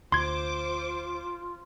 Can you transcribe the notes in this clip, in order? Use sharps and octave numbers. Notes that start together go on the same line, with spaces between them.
D2 F4 C5 C6 D6 G#6